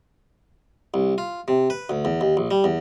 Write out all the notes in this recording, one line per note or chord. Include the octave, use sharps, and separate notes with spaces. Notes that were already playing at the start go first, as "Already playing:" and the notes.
C2
F4
C3
B4
D2
E2
D#2
A#1
G3
E2